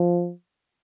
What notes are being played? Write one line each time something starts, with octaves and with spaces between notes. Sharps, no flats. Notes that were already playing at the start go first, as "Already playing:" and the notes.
Already playing: F3